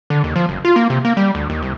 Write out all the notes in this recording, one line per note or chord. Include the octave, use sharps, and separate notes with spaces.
D3
D#2
F3
F#1
F4
A#3
C3
A#3
G3
D2
D#2
C2